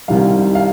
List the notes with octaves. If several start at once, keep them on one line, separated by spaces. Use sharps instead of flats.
C2 C3 D#3 G3 F5
F5